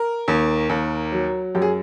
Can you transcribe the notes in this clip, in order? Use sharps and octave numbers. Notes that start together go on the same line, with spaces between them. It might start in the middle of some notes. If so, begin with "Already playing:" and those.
Already playing: A#4
D#2
D#2
F#3
F#2 G4
G#4